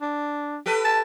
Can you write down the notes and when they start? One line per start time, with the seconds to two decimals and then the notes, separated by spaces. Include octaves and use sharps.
0.01 D4
0.66 G4 A4 B4
0.85 A5